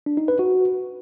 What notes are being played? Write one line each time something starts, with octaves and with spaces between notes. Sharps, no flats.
D4
D#4
B4
F#4